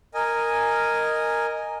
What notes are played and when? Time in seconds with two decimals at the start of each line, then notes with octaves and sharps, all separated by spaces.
0.14 A#4 D#5 G#5